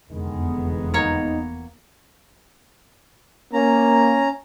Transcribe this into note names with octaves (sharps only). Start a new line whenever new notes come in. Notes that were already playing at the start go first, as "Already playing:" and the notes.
F1 E2 D3 D#3 G#3 B3
A#3 D#4 C#5
A#3 C#4 A#5